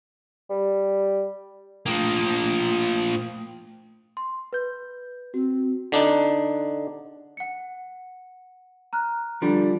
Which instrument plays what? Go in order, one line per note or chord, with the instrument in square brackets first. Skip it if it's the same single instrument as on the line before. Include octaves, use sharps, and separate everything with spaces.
[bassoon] G3
[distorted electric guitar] F3 A#3 [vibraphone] A3 G5 D#6
[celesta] C6
B4 G6
[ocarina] C4 [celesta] F#4
[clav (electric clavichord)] D3 D4 D#4
[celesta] F#5 C#7
A#5 F6 F#6
[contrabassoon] D3 [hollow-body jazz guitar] F3 G3 [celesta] D7